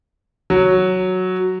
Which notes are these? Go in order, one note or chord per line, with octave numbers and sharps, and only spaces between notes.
F#3